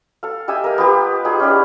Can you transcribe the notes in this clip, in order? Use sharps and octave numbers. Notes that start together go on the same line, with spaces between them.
A4 F5
G4 D#5 E5 G#5
A#3 A#4
B3 F4 G4
D#4 F4 G4 G#4
C#4 E4 G4 D5